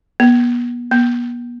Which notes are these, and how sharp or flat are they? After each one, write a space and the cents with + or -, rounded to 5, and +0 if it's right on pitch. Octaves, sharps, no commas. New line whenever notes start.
B3 -35
B3 -40